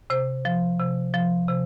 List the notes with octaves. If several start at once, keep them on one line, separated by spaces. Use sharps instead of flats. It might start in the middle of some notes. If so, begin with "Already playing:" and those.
C3 C5
F3
C3
F3
C3